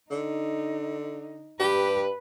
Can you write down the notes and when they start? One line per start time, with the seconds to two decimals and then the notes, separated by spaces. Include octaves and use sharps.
0.11 D3 D#4
1.60 G2 G4 B4